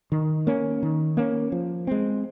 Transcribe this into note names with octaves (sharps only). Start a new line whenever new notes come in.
D#3
A#3 C#4
D#3
A#3 C#4
F3
G#3 C4